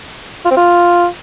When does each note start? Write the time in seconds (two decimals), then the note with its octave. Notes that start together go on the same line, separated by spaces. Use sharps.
0.45 F4
0.51 C4
0.57 F4